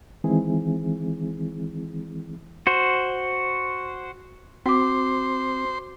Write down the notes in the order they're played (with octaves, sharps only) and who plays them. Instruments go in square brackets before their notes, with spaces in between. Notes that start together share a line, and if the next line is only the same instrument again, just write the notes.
[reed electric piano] D#3 E3 G#3 C4 E4 G#4
[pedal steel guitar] F#4 C5
[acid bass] C4 [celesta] F#4 D6 [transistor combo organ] C5